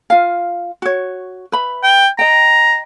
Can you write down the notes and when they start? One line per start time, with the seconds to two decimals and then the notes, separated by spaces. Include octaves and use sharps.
0.10 F4 F5
0.82 F#4 C#5
1.52 B4 E5 B5
1.84 G5
2.19 D#5 G5 A#5